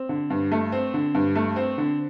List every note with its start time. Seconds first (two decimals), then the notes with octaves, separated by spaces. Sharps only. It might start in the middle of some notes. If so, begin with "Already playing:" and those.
Already playing: C4
0.09 D3
0.30 G2
0.52 A3
0.72 C4
0.94 D3
1.15 G2
1.36 A3
1.56 C4
1.78 D3